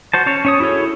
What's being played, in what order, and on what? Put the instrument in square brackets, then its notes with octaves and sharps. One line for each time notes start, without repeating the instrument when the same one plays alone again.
[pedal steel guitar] F#4 C5 A5
C#4 C#5 A5
C#4 C#5 D#6
E4 F#4 G#4 A4 C#5